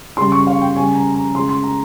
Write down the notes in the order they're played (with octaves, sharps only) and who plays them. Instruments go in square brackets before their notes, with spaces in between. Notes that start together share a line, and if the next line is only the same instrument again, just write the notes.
[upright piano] C#3 G3 C6
C#6
F5
G5
C#3 G3 G#5
A#5
A#5
C#3 G#3 C6
C6
A#5